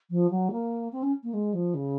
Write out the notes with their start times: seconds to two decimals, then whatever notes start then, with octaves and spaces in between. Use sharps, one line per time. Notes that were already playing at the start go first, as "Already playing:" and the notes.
0.10 F3
0.31 F#3
0.51 A#3
0.92 C4
1.03 C#4
1.23 A#3
1.34 G#3
1.54 F3
1.74 C#3